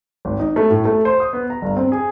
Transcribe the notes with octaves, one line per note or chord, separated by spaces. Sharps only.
G#1
D#4
A3
A2
A3
C5
D#6
B3
A#5
G1
C4
G#4